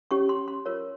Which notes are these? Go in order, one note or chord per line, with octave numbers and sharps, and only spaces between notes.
C#4 G4 C#5 C#6
C6
C6
F4 A#4 C#5